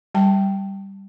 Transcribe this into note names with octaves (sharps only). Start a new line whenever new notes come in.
G3 G5 A5